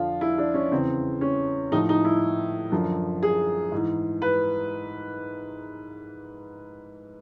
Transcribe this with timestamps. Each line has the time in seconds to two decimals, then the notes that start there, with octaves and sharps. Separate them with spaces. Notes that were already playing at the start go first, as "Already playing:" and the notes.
Already playing: F2 D3 F3 F4
0.21 E4
0.38 D4
0.54 C#4
0.71 E2 C#3 E3 C4
1.21 C#4
1.72 A2 F3 D#4
1.89 D#4
2.05 E4
2.72 F#2 D3 F3
3.23 G#4
3.72 G#2 E3
4.22 B4